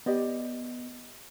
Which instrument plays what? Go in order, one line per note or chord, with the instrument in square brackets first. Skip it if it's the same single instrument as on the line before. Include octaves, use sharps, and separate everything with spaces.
[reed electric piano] B3 [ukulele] G4 D5 D#5